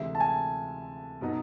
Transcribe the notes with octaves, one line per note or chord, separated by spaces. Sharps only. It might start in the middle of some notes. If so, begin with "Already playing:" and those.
Already playing: D2 C3 E3 G#3 E5
A5
G#5
B2 F#3 B3 D#4